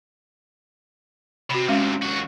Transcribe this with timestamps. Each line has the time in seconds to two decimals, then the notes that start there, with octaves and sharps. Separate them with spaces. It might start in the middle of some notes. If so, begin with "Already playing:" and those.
1.50 C3 F#4 B5
1.68 D2 C3 G#3 C#4 F5
2.02 D#2 F#4